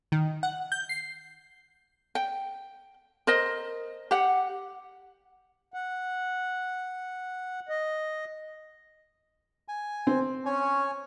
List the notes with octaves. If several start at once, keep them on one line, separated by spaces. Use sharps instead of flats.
D#3
F#5
G6
C7
G5
A#4 C5 D#5
G4 F#5
F#5
D#5
G#5
C4
C#4 C#5 G#5